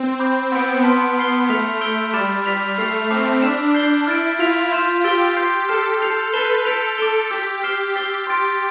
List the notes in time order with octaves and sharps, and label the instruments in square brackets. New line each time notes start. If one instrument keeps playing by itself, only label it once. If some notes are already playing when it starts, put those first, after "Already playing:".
Already playing: [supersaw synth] C4
[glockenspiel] B5 D6 G6
[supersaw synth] B3 [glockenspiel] B5 E6 G6 D7
[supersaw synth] B3 [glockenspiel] A5 C6 F6 B6 D7
[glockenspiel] B5 F6 C7 G7
[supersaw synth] A3 [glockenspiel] F6 B6 F7
[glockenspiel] E6 G6 B6 D7 G7
[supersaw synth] G3 [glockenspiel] B5 D6 F6 A6 E7
[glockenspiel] F6 B6 F7
[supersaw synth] A3 [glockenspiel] F6 C7 F7
[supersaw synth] C4 [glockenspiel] A5 D6 F6 C7
[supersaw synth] D4 [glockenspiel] E6 B6 E7
[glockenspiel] G6 C7 G7
[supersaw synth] E4 [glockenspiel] F6 A6 D7
[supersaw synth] F4 [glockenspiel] F6 B6 F7
[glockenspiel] C6 G6 B6 E7
[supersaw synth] G4 [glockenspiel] E6 A6 D7 G7
[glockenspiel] C6 G6 C7
[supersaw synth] A4 [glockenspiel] F6 C7 E7
[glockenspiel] G6 C7 F7
[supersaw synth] B4 [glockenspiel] G6 C7 E7 G7
[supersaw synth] A4 [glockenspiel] G6 B6 D7 F7
[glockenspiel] D6 A6 D7 G7
[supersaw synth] G4 [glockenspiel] E6 G6 B6
[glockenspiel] F6 C7 E7 G7
[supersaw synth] G4 [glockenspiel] E6 A6 C7 G7
[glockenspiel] C6 F6 A6 D7